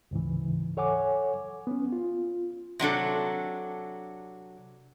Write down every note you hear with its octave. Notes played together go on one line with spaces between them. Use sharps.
D2 G#2 C#3 E3
A4 C#5 F#5 G#5 D6
B3 C#4
F4
C3 F#3 D4 A4